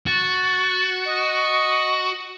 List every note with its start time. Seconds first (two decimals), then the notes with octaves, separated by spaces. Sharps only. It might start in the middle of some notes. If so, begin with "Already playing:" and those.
0.07 F#4 A6
1.05 D#5